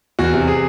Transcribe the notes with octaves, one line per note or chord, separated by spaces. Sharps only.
E2 F#4
C3
G#4